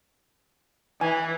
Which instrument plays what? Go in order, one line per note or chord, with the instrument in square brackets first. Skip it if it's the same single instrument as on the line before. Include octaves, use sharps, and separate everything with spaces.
[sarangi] E3 [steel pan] G#5